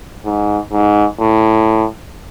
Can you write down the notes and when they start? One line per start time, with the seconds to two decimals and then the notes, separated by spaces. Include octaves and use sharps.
0.26 G#2
0.72 G#2
1.19 A2